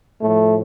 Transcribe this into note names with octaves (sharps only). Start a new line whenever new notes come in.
A2 F3 A3